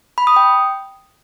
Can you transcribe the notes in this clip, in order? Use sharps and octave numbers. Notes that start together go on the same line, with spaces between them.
B5
D#6
G5